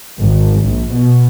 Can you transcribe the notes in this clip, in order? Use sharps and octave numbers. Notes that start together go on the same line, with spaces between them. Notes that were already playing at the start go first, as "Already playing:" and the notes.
G#1
A#1
B2